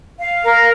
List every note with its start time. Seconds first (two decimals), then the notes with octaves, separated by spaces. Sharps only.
0.19 F5
0.44 A#4